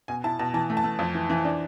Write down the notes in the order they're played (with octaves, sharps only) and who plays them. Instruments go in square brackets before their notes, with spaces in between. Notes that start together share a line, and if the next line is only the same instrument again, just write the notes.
[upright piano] B2 G#5
E4 A5
B2 A5
E3 A5
A3
A5
A3
F2
E3
E3
D4